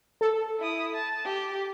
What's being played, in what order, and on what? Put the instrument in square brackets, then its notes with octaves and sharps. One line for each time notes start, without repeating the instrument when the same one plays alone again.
[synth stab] A4
[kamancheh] E4 D#6
A5
G4